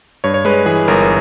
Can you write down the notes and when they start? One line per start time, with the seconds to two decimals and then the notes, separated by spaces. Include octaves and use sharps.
0.24 G2 C#5
0.34 C#5
0.45 G#3 B4
0.66 E3 G#4
0.88 G1 A#4